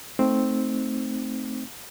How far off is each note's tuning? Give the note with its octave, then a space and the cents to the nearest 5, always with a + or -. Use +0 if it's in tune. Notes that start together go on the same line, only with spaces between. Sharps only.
A3 +0 C4 +0 D#4 +5